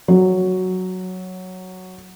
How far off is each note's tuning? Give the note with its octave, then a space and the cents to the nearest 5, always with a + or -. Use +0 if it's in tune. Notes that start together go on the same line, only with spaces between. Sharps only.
F#3 +0